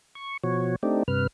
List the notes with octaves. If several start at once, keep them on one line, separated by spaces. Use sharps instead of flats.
C#6
B2 F3 F#4 C#5
A3 C4 D4 D#4 G4
G2 C3 B4 F6